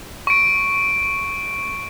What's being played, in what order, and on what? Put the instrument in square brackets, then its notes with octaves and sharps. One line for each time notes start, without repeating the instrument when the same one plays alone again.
[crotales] C#6 D7